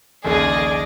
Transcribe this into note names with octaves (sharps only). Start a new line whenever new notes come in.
A#1 D#2 C#3 G#4 D5 D#5 G#5